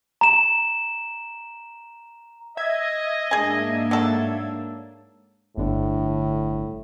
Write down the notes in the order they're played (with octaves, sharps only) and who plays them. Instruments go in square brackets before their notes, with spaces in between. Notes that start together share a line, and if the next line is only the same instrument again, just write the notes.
[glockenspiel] A#5 E7
[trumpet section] D#5 [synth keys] E5 G#6
[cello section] G#2 A#3 D4 [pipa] G#4 G#5
[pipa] F#3 A4
[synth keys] G1 D3 [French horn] A2